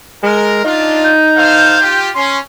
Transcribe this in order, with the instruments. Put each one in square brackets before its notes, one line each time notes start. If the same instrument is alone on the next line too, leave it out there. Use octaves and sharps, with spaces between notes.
[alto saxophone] G#3 [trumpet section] A#4
[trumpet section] D4 F4 [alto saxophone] D#4
[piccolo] G6
[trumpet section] A4 C5 F5
F4 G4
[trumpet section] C#4 [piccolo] C6